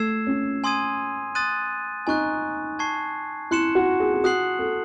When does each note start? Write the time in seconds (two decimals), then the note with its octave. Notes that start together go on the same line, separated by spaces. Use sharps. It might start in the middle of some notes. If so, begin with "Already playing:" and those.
Already playing: A3 E6 G#6 C7 E7
0.27 C#4
0.64 G#5 C6 D#6 G#6 D#7
1.35 C6 D#6 F#6 A6 D#7
2.07 D#4 G#5 C#6 F#6
2.79 A5 C#6 G#6 C7
3.51 E4 C6 F#6 C#7 E7
3.75 F#4
4.00 G#4
4.14 G#4
4.24 F#4 D#6 F#6 C7 F#7
4.59 A4